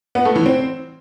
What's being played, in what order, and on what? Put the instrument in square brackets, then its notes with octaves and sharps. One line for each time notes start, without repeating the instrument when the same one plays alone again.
[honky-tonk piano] B3
A3
E3
C4